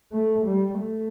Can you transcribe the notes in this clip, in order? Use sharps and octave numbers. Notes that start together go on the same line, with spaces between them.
A3
G3
A3